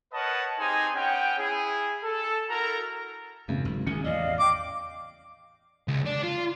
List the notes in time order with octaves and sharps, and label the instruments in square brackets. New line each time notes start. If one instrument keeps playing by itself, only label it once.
[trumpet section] A#4 B4 C#5 D#5 F#5 A5
C4 D#4 G4 G#4 C5 G#5
B3 C#4 F#5 G5
E4 G#4
A4
E4 F#4 A4 A#4 A#5
[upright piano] G#1 C#3 [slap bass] F2
[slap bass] F#1
[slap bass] A1 D#3 C#4 [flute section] G#4 [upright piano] C#7
[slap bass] A1 E2 [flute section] D5 D#5 F5
[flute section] G5 [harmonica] D6
[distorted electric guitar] C#2
D4
F4